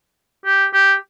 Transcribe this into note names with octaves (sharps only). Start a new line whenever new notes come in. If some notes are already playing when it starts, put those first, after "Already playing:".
G4
G4